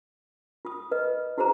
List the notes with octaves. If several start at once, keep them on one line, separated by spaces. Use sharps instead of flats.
F4 D#6
B4 D#5
E4 F#4 G#4 C5 A#5